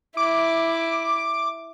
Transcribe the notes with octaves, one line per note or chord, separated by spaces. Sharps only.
E4 D6